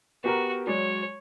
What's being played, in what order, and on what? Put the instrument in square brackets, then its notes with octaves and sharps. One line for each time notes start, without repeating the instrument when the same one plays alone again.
[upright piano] B3 G4 A#4 [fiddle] F#4
[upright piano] F#3 G#3 D5 [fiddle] C#5